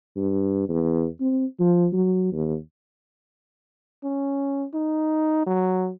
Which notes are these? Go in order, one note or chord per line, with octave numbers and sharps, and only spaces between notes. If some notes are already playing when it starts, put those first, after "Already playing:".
G2
E2
C4
F3
F#3
D#2
C#4
D#4
F#3